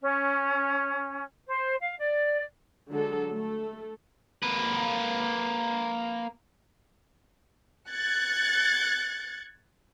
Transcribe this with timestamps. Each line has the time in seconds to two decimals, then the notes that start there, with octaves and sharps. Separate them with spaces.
0.02 C#4
1.46 C5
1.80 F5
1.99 D5
2.91 D3 F#3 G#3 A4
3.32 A3 A4
4.42 A#3 B4
7.89 F#6 G#6 A6 C#7